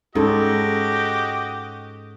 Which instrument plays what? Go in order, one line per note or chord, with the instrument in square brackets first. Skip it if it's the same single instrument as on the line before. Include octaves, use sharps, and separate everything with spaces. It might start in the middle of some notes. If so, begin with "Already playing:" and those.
[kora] G#2 [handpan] C#4 A4 [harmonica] F#4 G4 D#5